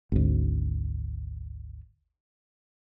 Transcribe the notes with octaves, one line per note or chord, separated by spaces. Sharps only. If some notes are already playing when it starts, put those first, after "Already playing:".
G#1 D2